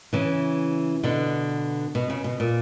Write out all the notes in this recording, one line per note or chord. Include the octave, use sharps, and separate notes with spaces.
C#3 E3
B2 D3
B2
C#3
B2
A#2